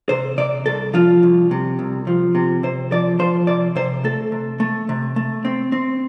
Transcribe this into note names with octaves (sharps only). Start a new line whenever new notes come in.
C3 C5
C3 D5
C2 A4
F3 F4
C2
C3
C2
F3
C3
C3 C5
F3 D5
F3 C5
C3 D5
C3 C5
A3 A4
C3
A3
C3
A3
C4
C4